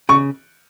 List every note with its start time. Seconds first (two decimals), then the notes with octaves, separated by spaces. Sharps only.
0.09 C#3 C#6